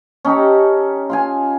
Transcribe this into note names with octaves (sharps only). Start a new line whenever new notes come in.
C#4 D#4 G4 A4
F4 F5 G#5